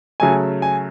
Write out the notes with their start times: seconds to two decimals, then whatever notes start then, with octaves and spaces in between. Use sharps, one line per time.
0.20 C#3 F#3 A3 G#5
0.62 G#5